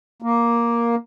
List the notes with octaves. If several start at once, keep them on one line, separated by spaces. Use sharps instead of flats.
A#3